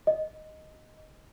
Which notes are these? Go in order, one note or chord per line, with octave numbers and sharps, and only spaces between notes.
D#5